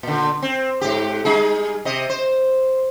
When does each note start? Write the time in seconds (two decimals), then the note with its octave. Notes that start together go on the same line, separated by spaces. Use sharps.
0.03 A#2 D3
0.42 C4
0.81 G#2 G4
1.25 G3 D#4 G#4
1.85 C3 D#5
2.10 C5